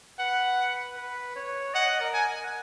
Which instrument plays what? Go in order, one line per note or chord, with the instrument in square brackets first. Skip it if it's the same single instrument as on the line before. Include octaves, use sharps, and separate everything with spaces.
[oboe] B4 [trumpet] F#5
[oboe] B4
C#5
[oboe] D#5 [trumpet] F#5
[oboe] A#4
[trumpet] G#5
[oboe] F#5